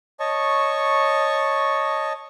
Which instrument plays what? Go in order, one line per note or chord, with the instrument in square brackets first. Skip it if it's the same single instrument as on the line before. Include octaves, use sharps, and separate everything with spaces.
[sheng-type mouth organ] C#5 D#5 A5 C#6